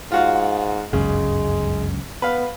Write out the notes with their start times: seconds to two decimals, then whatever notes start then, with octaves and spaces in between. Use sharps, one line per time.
0.12 G#2 F4 F#4 F5
0.93 G1 C#2 F#2 C#3 G#3
2.22 B3 B4 F5